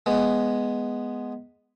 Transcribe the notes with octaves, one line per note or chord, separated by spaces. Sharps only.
G#3 B3